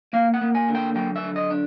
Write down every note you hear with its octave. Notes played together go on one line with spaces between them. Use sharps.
A#3 F5
F#5
A#3
G#5
D3
G5
F#3 G5
E5
D3
D#5
D4